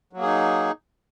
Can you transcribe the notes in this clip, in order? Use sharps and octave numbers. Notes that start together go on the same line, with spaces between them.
F#3 A#3 D#4 G#4